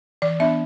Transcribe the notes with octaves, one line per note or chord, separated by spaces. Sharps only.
E3 D5
B3 D4 E5